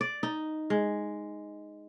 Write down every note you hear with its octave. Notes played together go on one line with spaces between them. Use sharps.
D5
D#4
G#3